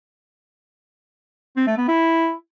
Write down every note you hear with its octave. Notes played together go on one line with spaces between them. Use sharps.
C4
A3
B3
E4